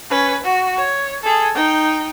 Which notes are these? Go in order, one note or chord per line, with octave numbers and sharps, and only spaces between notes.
C#4 B4
F#4
C#5
G#4 A4
D#4 G5